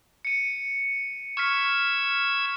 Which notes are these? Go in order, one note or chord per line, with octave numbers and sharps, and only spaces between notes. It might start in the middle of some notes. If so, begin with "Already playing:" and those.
C#7 D#7
C#6 E6 F6 G#6 B6